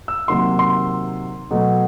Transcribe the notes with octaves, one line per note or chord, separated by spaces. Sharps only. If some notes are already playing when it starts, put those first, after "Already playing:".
E6
C3 D#3 F#3 A#3 C6
C6
B2 F#3 A3